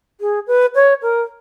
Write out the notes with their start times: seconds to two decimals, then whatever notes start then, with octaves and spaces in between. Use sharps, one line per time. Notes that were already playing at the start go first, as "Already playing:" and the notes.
0.21 G#4
0.47 B4
0.75 C#5
1.02 A#4